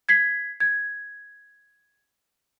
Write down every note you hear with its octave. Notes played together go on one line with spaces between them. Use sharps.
G#6 B6 C7
G#6